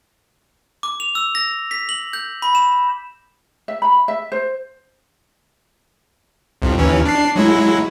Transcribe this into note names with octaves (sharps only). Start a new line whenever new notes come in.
D6
F7
E6
A#6
B6
F#7
G6
B5
E7
E5
B5
E5
C5
C2 F2
D#2 E3 C#4
D4 C7
F#3 G#3 E4